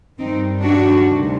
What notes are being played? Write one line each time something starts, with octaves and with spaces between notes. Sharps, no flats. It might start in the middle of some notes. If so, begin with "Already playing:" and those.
G2 D#3 G3 C4 D#4
D4 F#4
D2 C3 D#3 G3